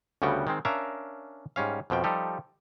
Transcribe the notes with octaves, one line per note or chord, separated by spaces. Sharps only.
D2 C#3 G3 B3 F#4 G5
D#3 G#3 C4
C#4 D4 A#4 E5 F5 A#5
G#2 G3 C#4 F5
F2 B2 F3 G5
F3 G3 D#4 G4 A4